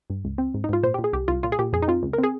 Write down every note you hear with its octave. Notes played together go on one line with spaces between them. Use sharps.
G2
C#2
C4
G#2
D#4
G#2 F4
A#2 C5
A#2 G4
G#4
C2 G4
C2 F4
A#2 F4
G#4
A#2 G4
F2 G#4
D#4
C4 F4
C#2
A#4
C4
G#4